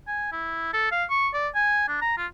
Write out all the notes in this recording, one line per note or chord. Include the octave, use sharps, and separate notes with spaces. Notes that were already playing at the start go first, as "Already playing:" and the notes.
G#5
E4
A4
F5
C#6
D5
G#5
D4
A#5
F4